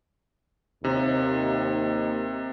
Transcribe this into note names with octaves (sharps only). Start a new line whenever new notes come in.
D#2 C3 D#4